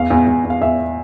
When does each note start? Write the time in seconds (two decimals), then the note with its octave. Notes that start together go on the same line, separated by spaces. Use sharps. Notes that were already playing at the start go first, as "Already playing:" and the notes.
Already playing: E2 F5
0.10 E2
0.27 E2
0.44 E2
0.50 F5
0.61 E2 E5